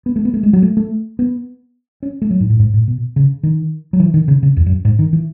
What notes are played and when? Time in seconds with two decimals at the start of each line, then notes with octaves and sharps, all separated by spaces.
0.06 B3
0.16 A3
0.25 B3
0.34 A3
0.43 G#3
0.53 F#3
0.62 A3
0.77 A3
1.19 B3
2.03 C#4
2.22 A3
2.31 F#3
2.40 G#2
2.50 A2
2.59 G#2
2.74 A2
2.88 B2
3.16 C#3
3.43 D#3
3.93 F#3
4.00 E3
4.14 D#3
4.28 C#3
4.43 C#3
4.57 E2
4.66 F#2
4.85 G#2
4.99 D#3
5.13 E3